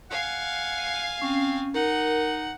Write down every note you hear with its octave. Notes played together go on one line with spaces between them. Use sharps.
F5 F#5 G#5
C4 C#4
D#4 A#4 F#5